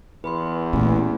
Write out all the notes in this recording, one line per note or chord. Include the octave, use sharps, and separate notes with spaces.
E2 B4 B5 C6
A1 A#2